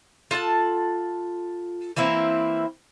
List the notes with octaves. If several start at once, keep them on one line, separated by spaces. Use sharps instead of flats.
F4 A4 F#5 A5
E3 A#3 C4 E4